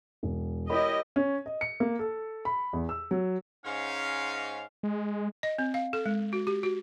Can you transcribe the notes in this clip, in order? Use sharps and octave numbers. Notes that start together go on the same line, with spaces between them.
E1
E4 G4 A#4 C#5 D#5 B5
C#4
D#5
C#7
A#3
A4
B5
E2
E6
F#3
G#2 C#4 F5
G#3
D#5
C4
F5
A4
G#3
F#4
G4
F#4